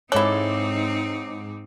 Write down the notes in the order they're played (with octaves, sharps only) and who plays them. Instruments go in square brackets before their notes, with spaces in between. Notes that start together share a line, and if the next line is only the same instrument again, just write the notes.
[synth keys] G#2 D6 [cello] C4 D#4 [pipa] E4 A4 [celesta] C#5